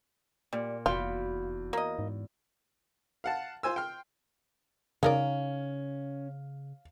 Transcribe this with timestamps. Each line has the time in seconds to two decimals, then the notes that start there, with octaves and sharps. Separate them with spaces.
0.53 A#2 G3
0.86 F1 E2 F4 F#4 G5 B5
1.73 A#3 D#5
1.99 G#2
3.24 F5 F#5 A5
3.63 F4 C5 G#5 E6
3.76 G5 C6 F6
5.03 C#3 C#4 D#4 A#4 D5 F5